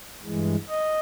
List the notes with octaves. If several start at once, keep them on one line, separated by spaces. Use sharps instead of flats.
G2 E3 G#3
D#5